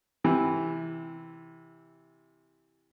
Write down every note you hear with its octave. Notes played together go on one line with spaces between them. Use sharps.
C3 E3